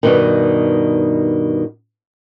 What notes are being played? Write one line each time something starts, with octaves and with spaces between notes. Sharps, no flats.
G2 B2 D#3